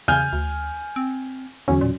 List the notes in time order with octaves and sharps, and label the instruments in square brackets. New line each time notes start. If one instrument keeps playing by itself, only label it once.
[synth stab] E2 [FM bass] C#3 [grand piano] G#5 F6 G6
[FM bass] D2
C4
[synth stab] E2 F#3 C#4 [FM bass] D3
[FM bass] A#2